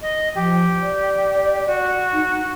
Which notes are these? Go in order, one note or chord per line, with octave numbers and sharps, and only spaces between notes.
D#5
F3 G4
D5
F#4
D#4